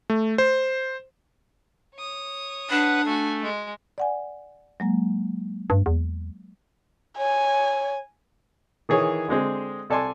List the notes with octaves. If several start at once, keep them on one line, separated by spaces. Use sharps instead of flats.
A3
C5
C#5 D#6
D4 B4 F#5
A3 F#4 G#5
G#3
D5 F#5 G#5
F#3 G#3 A#3
G2
E2
C#5 G#5
D#3 E3 G#4 C#5
D3 G#3 C4 G#4
C2 A4 D5 G#5 C6